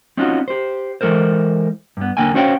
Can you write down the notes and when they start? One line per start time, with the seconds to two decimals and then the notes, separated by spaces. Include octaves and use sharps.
0.17 C4 C#4 D#4 F4 F#4
0.48 G4 C5
1.01 E3 G#3 A4 A#4 C5
1.97 G2 B3
2.17 D#2 D3 A#3 G5 G#5
2.34 C#4 F#4 C5 C#5 F5 G5